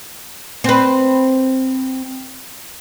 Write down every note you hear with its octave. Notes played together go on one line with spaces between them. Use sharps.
C4 B4